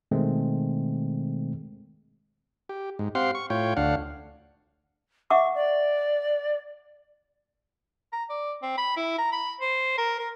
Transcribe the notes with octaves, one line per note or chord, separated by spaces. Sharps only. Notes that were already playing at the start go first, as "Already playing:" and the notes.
B2 D#3 G#3 A3 C4
G4
G#2
C4 G4 F5 F#5 C6
C#6
A2 F4 C#5 G5
D2 D4 F5 F#5
E5 F#5 C#6 D6
D5
A#5
D5
C4
B5
E4
A#5
B5
C5
A#4
A#4